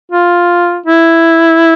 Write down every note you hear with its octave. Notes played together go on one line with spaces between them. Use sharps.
F4
E4